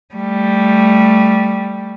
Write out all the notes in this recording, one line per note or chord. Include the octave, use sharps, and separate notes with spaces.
G3 A3